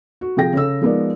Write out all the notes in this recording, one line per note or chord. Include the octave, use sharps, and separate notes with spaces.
F#4
C3 F3 G#4 G5 A#6
C#3 A4 E6
F3 G#3 B3 D#4 A#4 D5